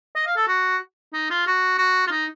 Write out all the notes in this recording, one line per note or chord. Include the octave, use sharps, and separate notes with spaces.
D#5
F5
A4
F#4
D#4
F4
F#4
F#4
F4
D#4